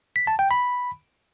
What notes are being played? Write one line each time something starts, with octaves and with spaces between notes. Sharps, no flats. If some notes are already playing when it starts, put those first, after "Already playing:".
B6
A5
G5
B5